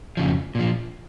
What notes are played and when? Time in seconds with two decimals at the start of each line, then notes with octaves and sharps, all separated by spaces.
0.17 F2 C#3 F3
0.55 A#2 F3